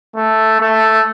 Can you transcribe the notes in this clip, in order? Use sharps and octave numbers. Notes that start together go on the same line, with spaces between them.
A3
A3